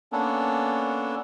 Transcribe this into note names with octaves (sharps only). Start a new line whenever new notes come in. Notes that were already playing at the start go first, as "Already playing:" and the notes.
A#3 B3 C#4 D4 A4